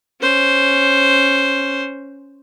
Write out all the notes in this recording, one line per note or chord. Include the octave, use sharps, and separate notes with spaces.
C#4 C5